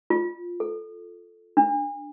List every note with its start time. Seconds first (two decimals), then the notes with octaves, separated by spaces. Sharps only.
0.10 F4
0.60 A4
1.57 D4